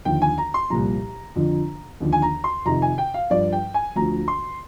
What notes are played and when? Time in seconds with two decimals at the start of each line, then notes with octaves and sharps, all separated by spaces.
0.05 D#2 D3 F3 G5
0.22 G#5
0.38 A#5
0.54 C6
0.70 C2 A#2 F3 A#5
1.36 F2 D3 F3
2.00 D#2 D3 F3
2.13 G#5
2.22 A#5
2.44 C6
2.65 F2 C3 D#3 A#5
2.82 G#5
2.98 G5
3.14 F5
3.30 G2 F3 D5
3.52 G5
3.74 G#5
3.96 D2 D3 F3 A#5
4.28 C6